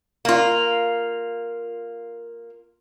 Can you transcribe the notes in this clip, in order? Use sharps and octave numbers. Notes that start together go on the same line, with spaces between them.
A#3 F4